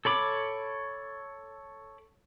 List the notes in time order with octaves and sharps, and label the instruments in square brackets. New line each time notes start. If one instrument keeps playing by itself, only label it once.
[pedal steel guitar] A4 C#5 B5 D6